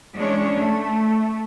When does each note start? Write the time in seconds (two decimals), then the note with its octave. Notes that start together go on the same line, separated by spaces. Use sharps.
0.15 E3 G#3 C#4 D4 C#5
0.58 A3